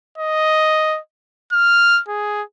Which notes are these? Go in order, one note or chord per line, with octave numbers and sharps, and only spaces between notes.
D#5
F6
G#4